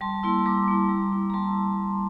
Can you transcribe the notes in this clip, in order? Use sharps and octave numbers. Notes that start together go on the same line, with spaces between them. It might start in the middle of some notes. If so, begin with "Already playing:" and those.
G3 A5 C6
A#3 E4 C6 E6
C6
G3 A#5 D6
A#3 E4
G3
A#3 E4
A#5
G3 A5 C6